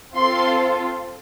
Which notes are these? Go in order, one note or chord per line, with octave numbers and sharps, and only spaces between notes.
C4 F4 A4 C6